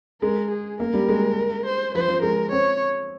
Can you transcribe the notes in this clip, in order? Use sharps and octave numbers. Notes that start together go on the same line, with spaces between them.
G#3 A#4
G#4
A#3 A#4
G3
G#3
C5
F3 C5
F3
G#3 A#4
C4 C#5